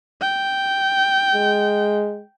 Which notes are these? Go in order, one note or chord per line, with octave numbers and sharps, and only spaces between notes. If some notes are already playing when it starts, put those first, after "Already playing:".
G5
G#3